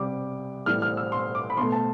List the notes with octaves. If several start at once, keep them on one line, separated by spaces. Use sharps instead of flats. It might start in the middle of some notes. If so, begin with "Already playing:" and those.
Already playing: C3 G3 D6
A2 E3 G3 F6
F6
E6
C6
D6
B5
B2 A3 C6
A5